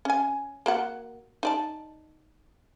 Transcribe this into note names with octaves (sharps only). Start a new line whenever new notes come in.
C#4 G#5
A#3 F#4 F#5
D#4 D5 A5